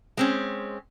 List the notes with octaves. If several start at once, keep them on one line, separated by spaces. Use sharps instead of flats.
G#3 C4 C#4